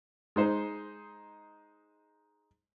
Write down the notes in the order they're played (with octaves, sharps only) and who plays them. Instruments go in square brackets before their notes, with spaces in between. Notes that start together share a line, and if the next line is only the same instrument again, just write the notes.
[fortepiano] G#3 D#4 C5